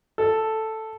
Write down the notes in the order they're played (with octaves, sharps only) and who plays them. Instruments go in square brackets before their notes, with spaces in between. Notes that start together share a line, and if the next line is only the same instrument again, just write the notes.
[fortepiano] A4